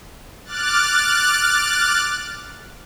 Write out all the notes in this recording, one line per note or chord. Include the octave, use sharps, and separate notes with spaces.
D6 F6 F#6 A6